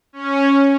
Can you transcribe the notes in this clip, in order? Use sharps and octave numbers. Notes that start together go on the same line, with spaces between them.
C#4